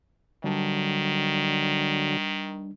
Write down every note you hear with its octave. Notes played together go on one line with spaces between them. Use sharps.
D3 D#3 F#3 G3 D4